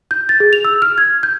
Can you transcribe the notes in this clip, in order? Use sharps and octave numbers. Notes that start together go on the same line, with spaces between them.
G6
A6
G#4
F7
E6
F6
G#6
G6